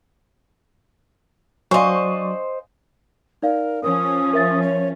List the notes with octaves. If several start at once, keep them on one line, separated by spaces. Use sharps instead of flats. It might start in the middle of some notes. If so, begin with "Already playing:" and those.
F#3 D4 C5 D#5 F5 G#5 C6 C#6
D#4 A#4 D5 F5
F3 C#4 A#4 D#6
A#4 E5 A6
C#5